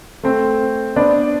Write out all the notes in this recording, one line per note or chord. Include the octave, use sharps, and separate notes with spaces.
A3 C4
B3 D4